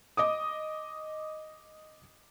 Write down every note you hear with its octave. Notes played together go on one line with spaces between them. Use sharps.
D#5 D6 D#6